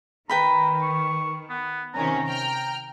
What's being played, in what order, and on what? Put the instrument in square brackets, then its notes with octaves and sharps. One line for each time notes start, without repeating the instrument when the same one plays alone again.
[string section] D#3 [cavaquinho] B4 G5 B5 [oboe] A#5
[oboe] C#6
B3
[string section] C3 D#3 C#4 [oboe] A#5
[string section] G5 F6